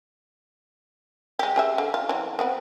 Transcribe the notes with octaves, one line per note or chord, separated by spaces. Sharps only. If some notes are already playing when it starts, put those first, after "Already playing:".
G#3 G4
G4 G#4 E5
D3
F4
E3 F#3
B3 C4 B4